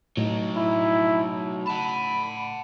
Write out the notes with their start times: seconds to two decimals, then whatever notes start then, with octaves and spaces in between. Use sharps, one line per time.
0.17 A2 F#3 D#4
0.57 E4
1.67 F#5 A5 B5